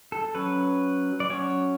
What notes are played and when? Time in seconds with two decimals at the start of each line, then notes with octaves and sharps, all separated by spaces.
0.12 A4
0.35 F#3 C#4 B4
1.20 D5
1.30 F#3 C#4 C#5